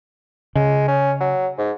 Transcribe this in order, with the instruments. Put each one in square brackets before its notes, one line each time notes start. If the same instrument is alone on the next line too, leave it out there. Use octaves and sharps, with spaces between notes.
[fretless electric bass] C#3 [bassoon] G#3
[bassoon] C#4
F#3
G#2